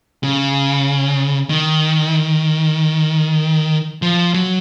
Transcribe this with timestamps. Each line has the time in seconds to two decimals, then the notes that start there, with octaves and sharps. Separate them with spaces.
0.24 C#3
1.50 D#3
4.02 F3
4.34 F#3